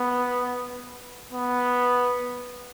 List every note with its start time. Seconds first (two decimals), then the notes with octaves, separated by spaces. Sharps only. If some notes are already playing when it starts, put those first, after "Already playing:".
Already playing: B3
1.33 B3